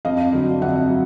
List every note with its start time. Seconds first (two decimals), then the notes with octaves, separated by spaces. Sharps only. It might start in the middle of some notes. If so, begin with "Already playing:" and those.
0.05 F2 D#5 F5
0.33 D3 F#3
0.61 F2 E5 F#5
0.90 F#3